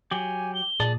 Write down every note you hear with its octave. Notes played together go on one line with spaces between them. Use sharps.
F#3 G4 G#5
G7
A#2 G#4 D5 A5